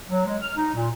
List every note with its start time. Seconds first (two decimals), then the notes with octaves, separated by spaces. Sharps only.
0.10 F#3
0.26 G#3
0.42 F6
0.56 D#4
0.75 A#2